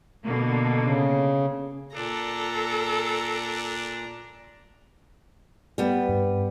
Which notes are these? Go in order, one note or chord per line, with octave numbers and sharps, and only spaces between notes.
B2 D3 A#3
C#3
A#2 D4 A4 A#5
G3 B3
G2